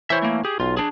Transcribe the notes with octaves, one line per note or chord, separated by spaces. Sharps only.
E3 E4 C5 C#5 E5
A3 A#3
G4 G#4
B1 F4
D4 G#4